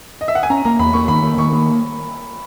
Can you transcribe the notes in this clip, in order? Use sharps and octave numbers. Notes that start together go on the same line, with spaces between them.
D#5
E5
F#5
G#5
C#4 A#5
A#3 A#5
E2 B5
A#3 C#6
D#3 B5
A#3
D#3 C#6
A#3